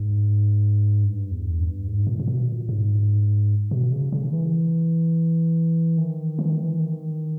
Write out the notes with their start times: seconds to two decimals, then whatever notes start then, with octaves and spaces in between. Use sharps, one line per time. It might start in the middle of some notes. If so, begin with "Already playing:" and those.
Already playing: G#2
1.04 G2
1.31 E2
1.59 G2
1.87 G#2
2.07 A#2
2.19 A#2
2.28 B2
2.48 A#2
2.69 G#2
3.71 B2
3.92 C#3
4.12 C#3
4.33 E3
5.98 D#3
6.39 E3
6.50 D#3
6.62 E3
6.80 D#3